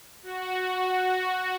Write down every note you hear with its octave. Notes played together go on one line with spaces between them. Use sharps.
F#4